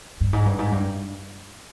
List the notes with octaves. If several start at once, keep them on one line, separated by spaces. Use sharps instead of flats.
G2
G#2
G2
G#2
G2